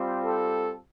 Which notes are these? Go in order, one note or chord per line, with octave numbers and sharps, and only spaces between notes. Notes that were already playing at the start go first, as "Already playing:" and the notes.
Already playing: G3 C4 F4
A4